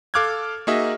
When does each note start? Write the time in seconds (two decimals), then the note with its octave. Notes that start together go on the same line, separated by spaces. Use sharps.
0.14 A4 F5 D6 F6 F#6 G#6
0.67 A#3 D#4 F#4 G#4 D#5 E5